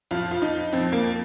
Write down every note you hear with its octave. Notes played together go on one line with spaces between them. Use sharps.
F2 F3 F4
F4
D#4
F2 F3 C4
A#3